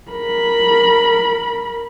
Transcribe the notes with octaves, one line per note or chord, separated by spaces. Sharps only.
A#4 B5